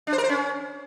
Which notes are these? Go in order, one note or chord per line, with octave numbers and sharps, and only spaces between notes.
D4
C5
A#4
C5
C#4